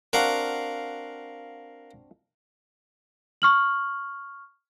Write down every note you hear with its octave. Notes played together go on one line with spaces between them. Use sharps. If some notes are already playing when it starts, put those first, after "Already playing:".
C4 D4 F#4 A#4 F5 F#5
C#6 F6 F#7